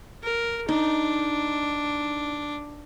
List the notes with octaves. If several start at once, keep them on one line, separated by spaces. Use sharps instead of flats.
A#4
D4 D#4